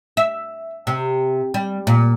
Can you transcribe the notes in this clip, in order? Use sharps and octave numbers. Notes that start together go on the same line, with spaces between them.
E5
C3
G3
A#2